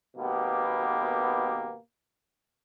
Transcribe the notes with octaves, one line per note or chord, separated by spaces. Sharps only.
G#1 B2 A#3 B3 G4